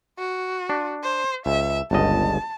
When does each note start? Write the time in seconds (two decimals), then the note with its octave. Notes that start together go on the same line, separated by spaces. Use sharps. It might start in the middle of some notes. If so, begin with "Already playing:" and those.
0.18 F#4
0.69 D4
1.03 C5
1.46 C#2 E5
1.91 G1 C#2 D#5 A5